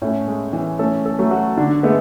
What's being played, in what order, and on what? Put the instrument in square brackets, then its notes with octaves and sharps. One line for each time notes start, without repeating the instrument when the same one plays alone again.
[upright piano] A2 [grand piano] A3 C#4
[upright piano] G#3
E3
[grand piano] A3 C#4 [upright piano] A4
[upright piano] A4
[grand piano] F#3 A3
[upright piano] F#4
[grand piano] D3 [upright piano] D4
[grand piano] G#3 B3 [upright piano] A3